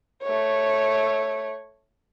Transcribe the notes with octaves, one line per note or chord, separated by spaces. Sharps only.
A3 C#5